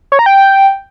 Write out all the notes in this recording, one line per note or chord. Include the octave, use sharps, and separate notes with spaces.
C#5
A#5
G5